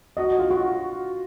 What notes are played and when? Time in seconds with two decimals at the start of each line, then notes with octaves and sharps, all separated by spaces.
0.17 F#4 D#5
0.39 F4
0.51 F#4